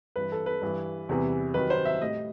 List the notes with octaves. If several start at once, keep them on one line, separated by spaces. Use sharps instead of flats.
G2 E3 G3 B4
A4
B4
G2 E3 G3
E2 C3 E3 G3
F#2 D#3 G3 B4
C5
E5
A2 G3 D#5